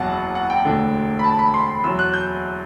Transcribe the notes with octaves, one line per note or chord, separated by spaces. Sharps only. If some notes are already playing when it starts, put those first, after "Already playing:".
Already playing: F#1 E2 B2 F#3 F#5 A5
F#5
G5
E1 D2 D3
B5
A5
B5
C6
E2 B2 F#3 E6
F#6
G6